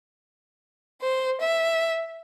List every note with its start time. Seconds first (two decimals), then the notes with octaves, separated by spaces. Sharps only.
1.01 C5
1.40 E5